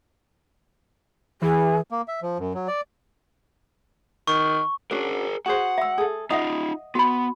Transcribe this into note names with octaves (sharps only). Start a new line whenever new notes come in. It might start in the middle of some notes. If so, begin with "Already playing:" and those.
E3 G#4
A#3
E5
F3
F#2
F#3
D5
D#3 C#6
C#4 D4 F#4 G#4 A#4
F#4 G#4 C5 F#5
E5 E6
G#4 A4
D#4 F4 D#5 E5 F#5 D#6
B3 F#4 B5